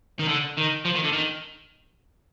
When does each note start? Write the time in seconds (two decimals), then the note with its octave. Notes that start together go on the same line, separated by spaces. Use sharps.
0.19 D#3
0.28 D3
0.58 D#3
0.85 F3
0.95 D#3
1.04 D3
1.13 D#3